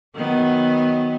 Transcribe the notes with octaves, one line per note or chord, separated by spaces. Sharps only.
D#3 F#3 B3